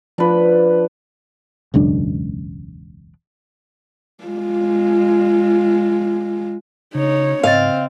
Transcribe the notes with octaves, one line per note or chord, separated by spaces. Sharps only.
F3 D4 F4 B4
E1 C#2 F#2 D4
G#3 F4
C#3 D#4 C#5
G#2 C#3 C4 D#5 F5 A6